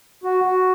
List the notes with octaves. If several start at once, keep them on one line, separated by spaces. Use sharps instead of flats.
F#4
F#4